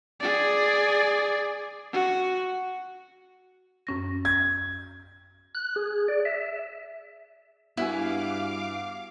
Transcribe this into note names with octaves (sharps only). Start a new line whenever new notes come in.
G#4 D5
F#4
F#2 C#4 A#6
G#6
F#6
G#4
D5
E5
G2 B3 E4 F#4 F5 G#5 D6